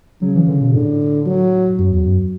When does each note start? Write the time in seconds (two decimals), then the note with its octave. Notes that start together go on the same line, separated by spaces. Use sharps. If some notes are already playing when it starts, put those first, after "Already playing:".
0.21 C#3 F#3
0.35 E3
0.47 D3
0.61 B2
0.74 A2 D3
1.26 F#3
1.79 F#2 F#3
1.92 E2
2.05 F#2